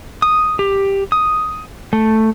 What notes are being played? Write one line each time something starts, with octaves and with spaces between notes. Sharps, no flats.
D#6
G4
D#6
A3